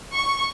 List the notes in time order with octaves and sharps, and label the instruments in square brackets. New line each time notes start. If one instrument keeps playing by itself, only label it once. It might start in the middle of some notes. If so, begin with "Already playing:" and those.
[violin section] C#6